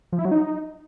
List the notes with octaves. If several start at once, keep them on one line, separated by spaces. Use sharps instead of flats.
F3
E4
F#3
D#4